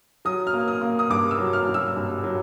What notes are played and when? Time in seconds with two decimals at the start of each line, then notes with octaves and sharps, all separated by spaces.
0.25 F#3 D#6
0.47 F6
0.54 A#3
0.68 D#6
0.81 A#3
0.99 D#6
1.10 G2 D6
1.31 E6
1.38 F#3
1.53 F6
1.68 F#3
1.74 E6
1.96 G2
2.23 F#3